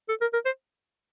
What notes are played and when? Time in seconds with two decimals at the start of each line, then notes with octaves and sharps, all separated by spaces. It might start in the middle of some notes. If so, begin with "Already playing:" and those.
0.09 A4
0.21 A#4
0.33 A#4
0.46 C5